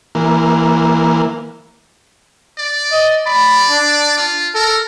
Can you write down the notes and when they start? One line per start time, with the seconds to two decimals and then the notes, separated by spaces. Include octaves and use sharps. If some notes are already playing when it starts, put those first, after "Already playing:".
0.15 E3 A#3
2.58 D5
2.92 D#5
3.26 D5 B5
3.70 D4
4.17 F4
4.55 A4 A#4